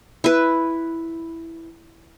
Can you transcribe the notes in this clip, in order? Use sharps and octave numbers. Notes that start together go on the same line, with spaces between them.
E4 B4